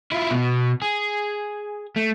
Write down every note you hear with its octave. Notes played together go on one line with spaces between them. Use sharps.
E4 F4
B2
G#4
A3